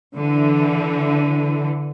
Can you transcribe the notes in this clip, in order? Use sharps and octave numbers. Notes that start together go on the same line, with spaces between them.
D3 E3